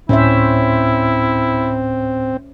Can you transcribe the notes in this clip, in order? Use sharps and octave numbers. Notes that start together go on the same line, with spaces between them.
D2 A2 C4 C#4 E4 C5 E5